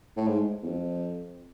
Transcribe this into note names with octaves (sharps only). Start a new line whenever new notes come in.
A2
G#2
E2
F2